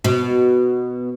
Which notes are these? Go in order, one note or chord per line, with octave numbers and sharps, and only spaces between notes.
B2